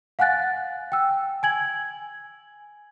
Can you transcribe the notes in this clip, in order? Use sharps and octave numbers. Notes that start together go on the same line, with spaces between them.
F5 F#5 G#5 F#6 A6
G5 E6
G#5 G#6 F#7